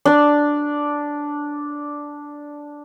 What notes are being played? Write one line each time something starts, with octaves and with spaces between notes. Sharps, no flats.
D4 D5